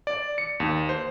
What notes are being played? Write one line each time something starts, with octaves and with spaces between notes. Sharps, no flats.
D5
C#7
D#2
C5